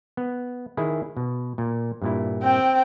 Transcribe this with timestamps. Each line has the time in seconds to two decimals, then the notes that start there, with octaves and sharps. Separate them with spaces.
0.17 B3
0.77 D#3 E4 G#4
1.17 B2
1.58 A#2
2.02 G2 A#2 E4
2.43 C4 G5